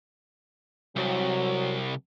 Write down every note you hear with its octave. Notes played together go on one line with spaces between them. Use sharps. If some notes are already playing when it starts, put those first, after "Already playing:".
C2 F#3